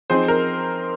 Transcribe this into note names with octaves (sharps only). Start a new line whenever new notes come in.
F3 C4 D#4 G#4 C5
A#4